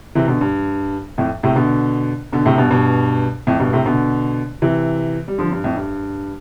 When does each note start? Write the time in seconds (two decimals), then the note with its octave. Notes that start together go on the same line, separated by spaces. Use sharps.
0.15 C3 E3
0.28 B2 D3
0.41 G2
1.18 F2 A2
1.43 A2 C3
1.56 B2 D3
2.33 B2 D3
2.46 A2 C3
2.58 G2 B2
2.70 G2 B2
3.47 F2 A2
3.60 G2 B2
3.73 A2 C3
3.86 B2 D3
4.62 C3 E3
5.28 G3
5.38 D3 F3
5.51 G2
5.64 F2 A2
5.76 G2